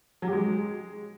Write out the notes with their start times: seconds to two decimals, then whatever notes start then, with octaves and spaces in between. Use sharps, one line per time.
0.22 F#3
0.27 G4
0.33 G#3